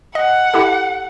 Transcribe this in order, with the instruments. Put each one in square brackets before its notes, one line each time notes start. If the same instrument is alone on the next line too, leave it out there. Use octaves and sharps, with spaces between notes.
[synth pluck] D#5 [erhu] F#5
[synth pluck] E4 G4 A4